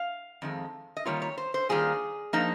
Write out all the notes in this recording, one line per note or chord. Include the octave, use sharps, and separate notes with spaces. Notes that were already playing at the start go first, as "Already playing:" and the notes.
Already playing: F5
F2 D#3 G#3
D#5
D#3 G3 A#3 F4 C#5
C#5
C5
C5
D#3 G3 A#3 F4 G#4
F3 A#3 D#4